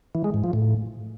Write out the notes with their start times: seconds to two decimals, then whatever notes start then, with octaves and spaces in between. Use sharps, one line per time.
0.15 E3
0.24 G#3
0.34 G#2
0.44 F3
0.53 A2